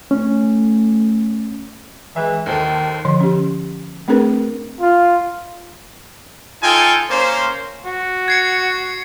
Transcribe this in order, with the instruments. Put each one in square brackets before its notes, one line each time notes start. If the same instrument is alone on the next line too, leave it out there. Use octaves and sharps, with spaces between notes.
[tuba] A3 [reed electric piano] C#4
[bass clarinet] E3 [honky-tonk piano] G#3 E5
[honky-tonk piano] D#2 A4 C5 [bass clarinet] D#3
[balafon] D3 F3 C6
C#4 G4
A3 C4 D4 G#4 A#4 B4
[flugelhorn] F4
[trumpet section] D#4 F4 A4 G5 G#5
A#3 C#4 C5
[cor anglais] F#4
[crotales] G#6 C7 C#7